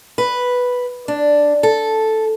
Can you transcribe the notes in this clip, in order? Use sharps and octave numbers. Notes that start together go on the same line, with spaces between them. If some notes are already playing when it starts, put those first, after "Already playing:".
B4
D4
A4